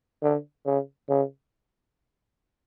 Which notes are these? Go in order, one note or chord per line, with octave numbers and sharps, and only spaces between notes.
D3
C#3
C#3